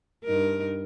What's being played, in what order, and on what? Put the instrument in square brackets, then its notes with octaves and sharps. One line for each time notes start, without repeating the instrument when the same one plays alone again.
[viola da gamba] G2 D#4 A#4